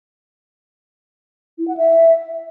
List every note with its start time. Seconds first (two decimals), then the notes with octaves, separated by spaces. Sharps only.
1.58 E4
1.68 F#5
1.77 E5